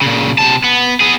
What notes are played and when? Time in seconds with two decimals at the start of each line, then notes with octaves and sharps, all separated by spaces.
0.02 A#2 C#3
0.38 C3 A5
0.64 B3
1.01 B3 G#4